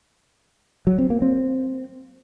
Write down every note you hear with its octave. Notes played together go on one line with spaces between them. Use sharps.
F#3
C4
A#3
C4